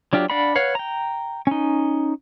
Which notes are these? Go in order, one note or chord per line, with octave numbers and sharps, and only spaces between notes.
F#3 D4 F4 G4
D4 D5 F5 F#5 B5
B4 C#5 F5 F#5
G5 A#5
C#4 D#4